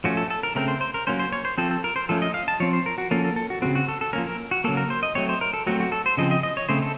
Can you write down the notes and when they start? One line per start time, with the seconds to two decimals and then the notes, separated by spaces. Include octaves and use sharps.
0.04 F3 A3 C#4 F#4
0.17 A4
0.30 A4
0.43 A#4
0.55 C#3 A3 C4 A#4
0.68 C5
0.81 C5
0.94 A#4
1.07 F#3 A#3 C#4 C5
1.19 C5
1.33 C#5
1.45 C5
1.58 F3 C4 A4
1.71 A4
1.84 A#4
1.96 C5
2.09 F3 A3 C#4 A4
2.22 D#5
2.34 F5
2.48 A5
2.60 F3 C4 C#5
2.73 C5
2.86 A#4
2.98 F#4
3.11 F3 A#3 C#4 A4
3.25 A4
3.36 A4
3.50 F#4
3.62 C#3 A3 C4 F#4
3.75 F#4
3.88 A4
4.01 A4
4.13 F3 A#3 C#4 A#4
4.27 A#4
4.51 F#4
4.64 C#3 F#3 A#3 A4
4.77 A#4
4.90 C5
5.03 D#5
5.15 F#3 A3 C4 C#5
5.29 C5
5.41 A#4
5.53 A4
5.67 F#3 A3 C4 F#4
5.80 F#4
5.92 A4
6.06 C5
6.17 C#3 F3 C4 D#5
6.31 D#5
6.43 D#5
6.57 C#5
6.69 C#3 A3 C4 C5
6.82 A4